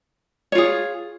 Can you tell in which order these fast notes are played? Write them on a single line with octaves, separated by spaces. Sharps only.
C#5 F4 G#4